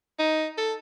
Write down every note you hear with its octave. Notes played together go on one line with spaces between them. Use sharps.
D#4
A4